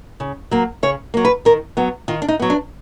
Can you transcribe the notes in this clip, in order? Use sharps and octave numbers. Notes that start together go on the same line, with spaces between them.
C#3
F#3 A#3
C#3 C#5
F#3 A#3
B4
D#3 A#4
F#3 B3
D#3 F4
D4
D#4
F#3 B3
D4